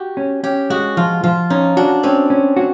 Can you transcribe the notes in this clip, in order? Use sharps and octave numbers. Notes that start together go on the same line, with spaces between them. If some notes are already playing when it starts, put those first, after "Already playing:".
Already playing: F#4 G4
C#4
C#4 G4
G#3 F#4
F3 F4
F3 F4
C#4 D#4
D4 F#4
C4 C#4
C#4
F#4